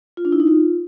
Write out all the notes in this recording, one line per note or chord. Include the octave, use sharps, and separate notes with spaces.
F4
D4
E4
D#4
F4